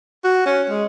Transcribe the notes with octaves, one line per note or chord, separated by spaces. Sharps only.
F#4
C#4
G#3